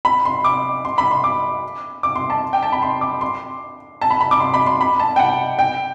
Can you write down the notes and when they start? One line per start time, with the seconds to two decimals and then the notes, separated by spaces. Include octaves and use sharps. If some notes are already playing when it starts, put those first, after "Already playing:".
0.05 B5
0.25 C6
0.44 D6
0.85 C6
0.98 B5
1.11 C6
1.24 D6
2.03 D6
2.16 C6
2.30 A5
2.53 G5
2.63 A5
2.72 B5
2.82 C6
3.01 D6
3.21 C6
4.01 A5
4.11 B5
4.21 B5
4.31 D6
4.40 C6
4.54 B5
4.66 C6
4.81 B5
4.99 A5
5.16 G5
5.19 F#5
5.59 G5